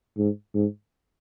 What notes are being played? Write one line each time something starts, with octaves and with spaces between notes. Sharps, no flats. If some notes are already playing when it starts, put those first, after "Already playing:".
G#2
G#2